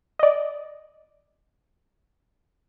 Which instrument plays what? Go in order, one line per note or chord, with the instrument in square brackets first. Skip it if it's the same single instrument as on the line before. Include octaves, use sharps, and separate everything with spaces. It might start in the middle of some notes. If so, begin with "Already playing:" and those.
[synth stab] D5 D#5